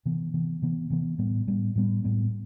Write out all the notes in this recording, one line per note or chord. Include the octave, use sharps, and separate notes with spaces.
C3 E3 B3
C3 E3 B3
C3 E3 B3
C3 E3 B3
A2 G3 B3
A2 G3 B3
A2 G3 B3
A2 G3 B3